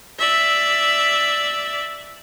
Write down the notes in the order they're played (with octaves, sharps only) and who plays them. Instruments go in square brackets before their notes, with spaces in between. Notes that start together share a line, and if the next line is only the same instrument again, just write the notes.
[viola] D5 E5